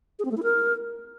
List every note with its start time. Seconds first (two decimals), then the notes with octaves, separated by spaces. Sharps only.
0.19 G#4
0.25 C4
0.31 A3
0.37 E4
0.43 A#4